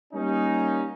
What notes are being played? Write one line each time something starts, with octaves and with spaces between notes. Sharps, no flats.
G3 A#3 C#4 D#4